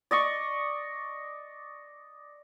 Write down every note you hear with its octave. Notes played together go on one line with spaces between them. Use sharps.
D5 D#5 C#6